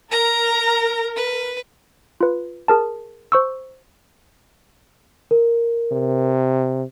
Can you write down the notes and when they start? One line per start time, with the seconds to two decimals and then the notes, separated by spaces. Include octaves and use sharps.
0.11 A#4 A#5
1.16 B4
2.21 F4 B4
2.68 G#4 A#4 A5
3.32 C5 C#6 E6
5.31 A#4
5.92 C3